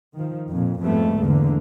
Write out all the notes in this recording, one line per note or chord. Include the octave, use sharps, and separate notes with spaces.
D#3 F3
F2 A#2
F2 G#2 G3 A3 B3
E2 D3 A3 A#3